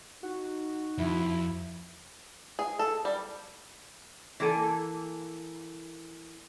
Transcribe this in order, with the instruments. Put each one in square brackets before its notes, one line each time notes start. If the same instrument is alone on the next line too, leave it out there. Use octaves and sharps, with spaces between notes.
[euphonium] D#4 [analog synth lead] F#4
[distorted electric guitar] F2 [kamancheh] E4
[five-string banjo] G#4
A4
G3
[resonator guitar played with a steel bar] E3 A#3 A4 G#5